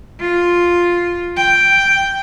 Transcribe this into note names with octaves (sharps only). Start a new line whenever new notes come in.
F4
G5